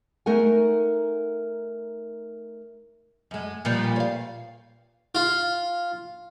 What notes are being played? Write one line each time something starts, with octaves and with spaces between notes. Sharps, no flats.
A3 D#4 A#4 F#5 G#5
F#2 G#3
A#2 F3 G3
C#5 F5
F4